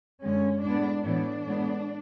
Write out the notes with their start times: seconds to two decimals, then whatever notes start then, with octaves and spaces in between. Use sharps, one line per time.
0.22 F#2 D3 G#3 C#4
0.63 A2 G#3 B3 D4
1.04 A2 E3 B3 D4
1.45 A2 G#3 B3